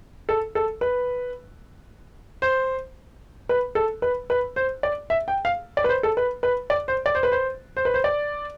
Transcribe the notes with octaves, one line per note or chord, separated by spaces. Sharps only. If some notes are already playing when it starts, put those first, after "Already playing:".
A4
A4
B4
C5
B4
A4
B4
B4
C5
D5
E5
G5
F5
D5
B4
C5
A4
B4
B4
D5
C5
D5
C5
B4
C5
C5
B4
C5
D5